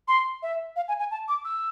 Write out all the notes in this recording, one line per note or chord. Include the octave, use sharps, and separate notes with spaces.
C6
E5
F5
G#5
G#5
A5
D6
E6